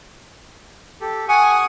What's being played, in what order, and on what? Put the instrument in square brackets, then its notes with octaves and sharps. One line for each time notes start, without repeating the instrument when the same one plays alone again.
[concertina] G4 A4
[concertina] F#5 C#6 D#6 [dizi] G#5